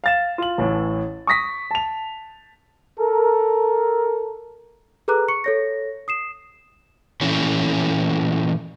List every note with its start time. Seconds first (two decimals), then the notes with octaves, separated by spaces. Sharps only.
0.04 F5 A6 E7
0.38 F4 F#7
0.58 A1 A2 E3
1.27 C#6 D#6 A#6 B6
1.71 A5 F7
2.99 A4 A#4
5.08 G#4 A4 B4 A#5 D6 F#6
5.28 C#6 C#7
5.44 A4 C#5 A#6
6.08 D#6 C7 E7
7.21 A#2 E3 C#4 E4 C#5